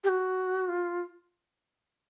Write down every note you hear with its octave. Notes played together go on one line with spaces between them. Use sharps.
G4
F#4
F4